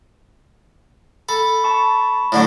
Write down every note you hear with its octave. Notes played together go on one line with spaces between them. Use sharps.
A4 B5
A5 B5 C#6
A2 D3 F#3